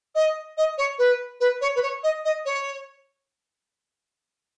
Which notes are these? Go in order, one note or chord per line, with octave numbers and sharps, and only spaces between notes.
D#5
D#5
C#5
B4
B4
C#5
B4
C#5
D#5
D#5
C#5